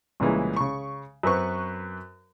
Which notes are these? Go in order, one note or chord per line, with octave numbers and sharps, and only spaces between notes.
C2 A#2 C#3 E3 G#3
C#3 C#6
F#2 C4 B4 C#6